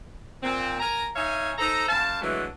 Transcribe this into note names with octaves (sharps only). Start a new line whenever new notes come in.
A#2 C4
A#4 G#5 A#5
D#4 C#5 E5 F5 G#5
D#4 A4 C5 A#5
F#2 F5 A5
D3 E3 F#3 G#3 A3